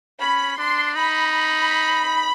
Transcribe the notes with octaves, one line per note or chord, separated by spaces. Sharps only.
C#4 B5
D4 C6
D#4 B5